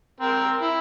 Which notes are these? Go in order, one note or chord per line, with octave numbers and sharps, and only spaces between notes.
C4 A#4
E4